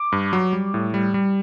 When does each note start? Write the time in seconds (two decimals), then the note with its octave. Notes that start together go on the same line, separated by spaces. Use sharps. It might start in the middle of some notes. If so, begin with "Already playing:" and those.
Already playing: D6
0.12 G2
0.33 F#3
0.53 G3
0.74 A2
0.94 G3
1.14 G3